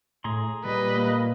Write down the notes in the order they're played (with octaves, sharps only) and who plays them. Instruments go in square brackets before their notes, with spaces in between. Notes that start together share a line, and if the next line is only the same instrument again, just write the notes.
[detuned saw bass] A2 [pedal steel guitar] G#4 A#5 C6
[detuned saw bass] A#2 [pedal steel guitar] G3 [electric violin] B4 D#5
[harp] A#3